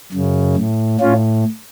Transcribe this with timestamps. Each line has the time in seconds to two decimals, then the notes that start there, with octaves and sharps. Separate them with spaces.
0.12 F#2 C#3
0.56 A2
1.00 A2 C#4 F4